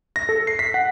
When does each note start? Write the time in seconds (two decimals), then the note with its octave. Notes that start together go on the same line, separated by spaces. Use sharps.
0.16 A#6
0.29 A4
0.47 C7
0.59 B6
0.74 F#5